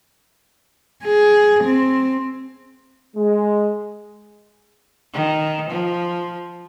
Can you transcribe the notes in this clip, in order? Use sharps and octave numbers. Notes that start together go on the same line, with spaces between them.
G#4
C4
G#3
D#3
F3